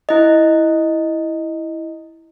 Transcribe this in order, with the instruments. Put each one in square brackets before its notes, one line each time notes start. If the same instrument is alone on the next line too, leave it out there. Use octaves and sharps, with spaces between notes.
[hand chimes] E4 D#5